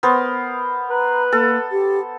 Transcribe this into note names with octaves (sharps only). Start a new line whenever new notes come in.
B3 A#4 C5
B4 A#5
A#3 A4
G4